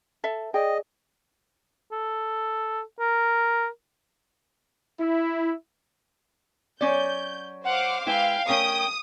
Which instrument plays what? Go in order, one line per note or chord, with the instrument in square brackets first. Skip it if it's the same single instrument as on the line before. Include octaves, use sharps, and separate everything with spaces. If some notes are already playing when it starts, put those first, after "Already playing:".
[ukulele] A4 E5
[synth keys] G#4 D5 [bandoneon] D#5 [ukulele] G5
[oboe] A4
A#4
[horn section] E4
[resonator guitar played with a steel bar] F#3 C#4 D5 [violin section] G6
[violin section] C5 F5 D6 [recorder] F#5
[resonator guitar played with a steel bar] G#3 E4 B4 [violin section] F5 [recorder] G5
[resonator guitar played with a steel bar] A3 C#4 A#4 [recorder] G5 [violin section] D#6